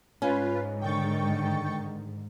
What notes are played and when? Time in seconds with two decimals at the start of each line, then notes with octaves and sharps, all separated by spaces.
0.22 G#2 C#4 F4 B4
0.81 D3 D#3 G5 C#6 A6